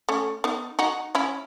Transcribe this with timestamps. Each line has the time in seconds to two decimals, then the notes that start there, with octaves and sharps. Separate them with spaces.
0.09 A3 C#4
0.44 B3 D#4
0.79 D#4 F#4
1.15 C#4 E4